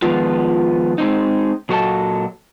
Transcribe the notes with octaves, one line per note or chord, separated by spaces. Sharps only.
D#3 F3 G#3 B3 F4
G#3 C4 D#4
A#2 F#3 F#4 A4 D#5 A5